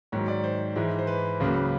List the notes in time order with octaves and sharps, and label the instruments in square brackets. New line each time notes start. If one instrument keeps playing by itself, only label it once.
[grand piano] G#2 D#3 F#3 C#5
D5
C5
G#2 E3 G#3
C5
B4
C#2 C#3 F#3 A#3